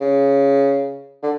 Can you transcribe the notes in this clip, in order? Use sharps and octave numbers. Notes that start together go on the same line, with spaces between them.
C#3
D3